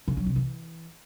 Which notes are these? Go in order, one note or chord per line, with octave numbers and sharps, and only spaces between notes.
C#3
F#3
C3
E3